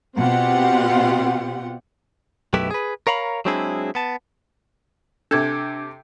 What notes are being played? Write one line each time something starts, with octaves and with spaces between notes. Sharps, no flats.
B2 C4 F4 G4 F#5
B1 F#2 A3 E4 G4 B4
G#4 B4
A#4 C#5 F5 A#5 B5
F#3 G#3 C4 D4 E4 G#4
B3 A5
C3 D4 A4 G6 G#6